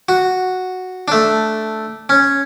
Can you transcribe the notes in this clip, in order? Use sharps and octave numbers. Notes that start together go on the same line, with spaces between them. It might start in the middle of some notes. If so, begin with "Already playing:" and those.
F#4
A3 D4
C#4